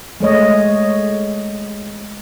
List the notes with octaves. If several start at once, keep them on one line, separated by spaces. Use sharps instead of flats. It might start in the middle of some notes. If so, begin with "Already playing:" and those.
G#3 A3 C#5 D#5